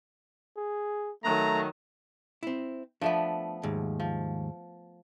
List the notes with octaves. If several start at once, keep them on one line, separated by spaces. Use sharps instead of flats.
G#4
D#3 F#3 A3 A#5
C4 E4
F3 A3 B3 D4
D#2 G#2
F3